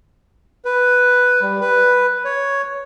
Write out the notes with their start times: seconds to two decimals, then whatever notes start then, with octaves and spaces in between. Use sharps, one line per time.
0.65 B4
1.42 G3
1.61 B4
2.25 C#5